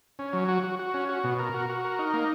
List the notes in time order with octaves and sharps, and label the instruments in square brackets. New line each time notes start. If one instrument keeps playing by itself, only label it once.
[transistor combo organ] C#4
F#3
F#4
F#4
F#4
C#4
F#4
B2
A#4
F#4
F#4
A#4
D#4
A#3